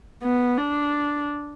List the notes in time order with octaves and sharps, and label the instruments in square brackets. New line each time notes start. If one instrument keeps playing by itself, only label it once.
[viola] B3
D4